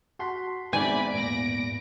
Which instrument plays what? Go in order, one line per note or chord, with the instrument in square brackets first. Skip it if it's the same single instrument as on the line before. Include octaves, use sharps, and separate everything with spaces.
[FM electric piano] F#4 C6 [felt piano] A5 F#6 B6
[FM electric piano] G#2 B3 [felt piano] C4 D#4 E5 [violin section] D5 B5 [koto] G#5
[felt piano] E2 A#2 [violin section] A#6 D7